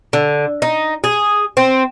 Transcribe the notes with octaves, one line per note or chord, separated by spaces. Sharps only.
D3
D#4
G#4
C4